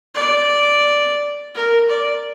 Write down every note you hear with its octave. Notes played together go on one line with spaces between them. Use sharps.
D5
A#4
D5